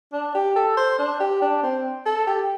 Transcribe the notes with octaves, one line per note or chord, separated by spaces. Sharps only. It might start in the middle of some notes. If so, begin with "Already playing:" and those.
D4
G4
A4
C5
D4
G4
D4
C4
A4
G4